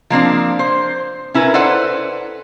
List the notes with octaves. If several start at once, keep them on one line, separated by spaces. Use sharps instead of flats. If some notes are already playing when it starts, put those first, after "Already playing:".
F3 A#3 C4 D4
C5
C#4 E4 A#4 B4
A4 B4 C5 D5 F#5